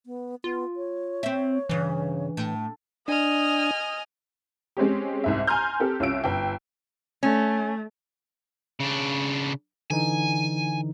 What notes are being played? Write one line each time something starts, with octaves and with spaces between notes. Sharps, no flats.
B3
B3 F4
C#5
C4 E5
G2 C#3 E3
A2
D4 D#5 G#5 D#6 F6
G#3 C4 C#4 G4
C2 G#2 E5
G#5 A#5 C6 F6 G6
C4 G4 A4
C2 C#4 F4 E6 D7
G1 G5
A3 C#4
C#3 D4
D3 E3 D#4 G#5